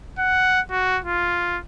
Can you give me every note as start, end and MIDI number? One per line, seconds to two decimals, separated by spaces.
0.18 0.60 78
0.71 0.99 66
1.04 1.59 65